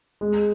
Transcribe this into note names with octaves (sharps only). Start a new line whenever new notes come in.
G#3